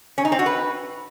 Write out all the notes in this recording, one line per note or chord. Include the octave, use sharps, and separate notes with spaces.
C#4
D#4
C4
F#4
B4